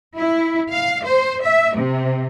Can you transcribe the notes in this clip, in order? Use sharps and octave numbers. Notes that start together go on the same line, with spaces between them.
E4
F5
C5
E5
C3